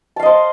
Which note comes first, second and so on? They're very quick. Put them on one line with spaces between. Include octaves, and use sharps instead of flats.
A5 F5 D#5 C5